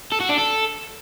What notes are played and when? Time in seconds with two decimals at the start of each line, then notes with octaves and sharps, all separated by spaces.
0.12 A4
0.21 F#4
0.29 D4
0.38 A4